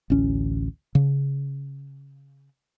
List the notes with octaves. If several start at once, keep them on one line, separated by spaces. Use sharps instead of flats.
A1 D2 C#4
C#3